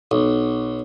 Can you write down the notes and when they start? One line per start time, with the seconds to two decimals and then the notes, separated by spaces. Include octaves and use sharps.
0.11 B1